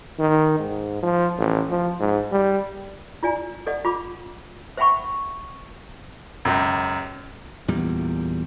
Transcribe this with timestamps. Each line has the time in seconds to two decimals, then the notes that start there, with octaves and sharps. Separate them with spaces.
0.19 D#3
0.59 G#2
1.03 F3
1.38 A1
1.70 F3
2.00 G#2
2.32 G3
3.23 E4 F4 D5 G#5
3.66 A4 D5 D#5 F#5
3.85 F4 B5 D6
4.77 C5 E5 F#5 G5 B5 C#6
6.45 C#2 F#2
7.68 E2 A#2 G3